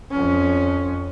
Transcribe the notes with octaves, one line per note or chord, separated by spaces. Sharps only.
F2 C#4